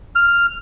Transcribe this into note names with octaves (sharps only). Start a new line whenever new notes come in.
F6